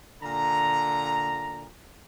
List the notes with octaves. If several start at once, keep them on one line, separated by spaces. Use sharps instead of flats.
A#2 D3 A#5